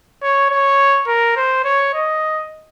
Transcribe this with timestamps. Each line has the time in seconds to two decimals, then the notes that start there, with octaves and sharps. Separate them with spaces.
0.22 C#5
0.51 C#5
1.07 A#4
1.36 C5
1.64 C#5
1.94 D#5